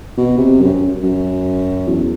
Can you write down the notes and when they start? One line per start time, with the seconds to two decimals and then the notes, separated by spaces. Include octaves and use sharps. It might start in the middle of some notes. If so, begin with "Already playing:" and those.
0.17 B2
0.38 C3
0.60 F#2
0.74 F#2
1.03 F#2
1.88 E2